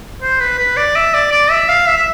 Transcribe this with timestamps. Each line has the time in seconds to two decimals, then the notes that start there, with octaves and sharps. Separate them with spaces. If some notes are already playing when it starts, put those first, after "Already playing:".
0.22 C5
0.40 B4
0.59 B4
0.77 D5
0.96 E5
1.14 D5
1.32 D5
1.51 E5
1.68 F5
1.87 E5
1.97 E5